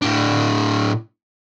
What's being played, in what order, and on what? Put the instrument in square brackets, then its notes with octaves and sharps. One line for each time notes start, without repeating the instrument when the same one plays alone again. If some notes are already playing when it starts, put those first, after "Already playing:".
[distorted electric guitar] A2 D4